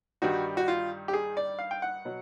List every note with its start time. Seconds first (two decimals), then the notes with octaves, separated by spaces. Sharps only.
0.22 G2 D#3 G3 F#4
0.57 F#4
0.68 F4
1.08 G4
1.13 G#4
1.37 D5
1.59 F5
1.71 G5
1.82 F#5
2.05 B2 F#3